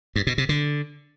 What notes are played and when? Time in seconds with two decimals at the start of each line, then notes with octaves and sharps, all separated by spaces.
0.16 G2
0.27 B2
0.38 C3
0.49 D3